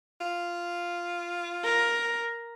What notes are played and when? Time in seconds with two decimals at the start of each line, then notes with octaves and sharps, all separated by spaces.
0.21 F4
1.64 A#4